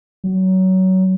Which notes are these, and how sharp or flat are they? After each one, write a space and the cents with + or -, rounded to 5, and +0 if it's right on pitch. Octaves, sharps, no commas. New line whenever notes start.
F#3 +20